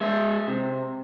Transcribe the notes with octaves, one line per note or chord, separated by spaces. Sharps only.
G#3 G#4 E5
C3